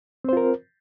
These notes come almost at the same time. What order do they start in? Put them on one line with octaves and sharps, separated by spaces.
C4 C5 F4 A#4